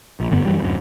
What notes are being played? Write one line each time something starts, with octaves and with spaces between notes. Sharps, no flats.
A#1
F1 G2 D3 B3
F#2 E3 G3
D1 F#2